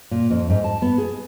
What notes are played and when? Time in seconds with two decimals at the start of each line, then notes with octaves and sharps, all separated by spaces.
0.11 A#2
0.30 F2
0.50 G#2
0.64 A5
0.82 B3
0.98 G#4